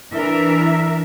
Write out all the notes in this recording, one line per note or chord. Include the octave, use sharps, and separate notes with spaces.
E3 D4 A#4 E5